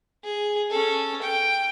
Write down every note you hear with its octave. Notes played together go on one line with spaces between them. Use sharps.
G#4
C#4 A4
G5